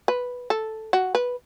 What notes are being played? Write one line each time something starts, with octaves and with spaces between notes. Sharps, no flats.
B4
A4
F#4
B4